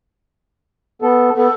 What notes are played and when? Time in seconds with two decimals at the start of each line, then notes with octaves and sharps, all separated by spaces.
1.02 B3 A4
1.36 B3 A4